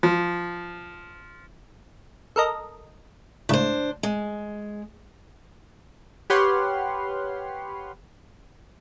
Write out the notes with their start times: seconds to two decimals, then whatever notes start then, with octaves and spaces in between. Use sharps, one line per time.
0.03 F3
2.36 A4 A#4 D#5
3.49 C#2 A2 D4 C5
4.03 G#3
6.30 G4 B4 C#5 F#5 C6 F6